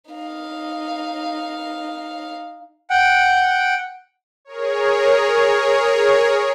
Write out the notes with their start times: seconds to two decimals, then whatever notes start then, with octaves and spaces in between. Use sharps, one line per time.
0.11 D#4 F5
2.90 F#5 G5
4.45 G#4 A#4 C#5